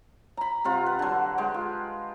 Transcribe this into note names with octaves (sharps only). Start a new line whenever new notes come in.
A#5 B5
C3 C4 F4 F#5
B4
D3 F#3
G#3 G5
F4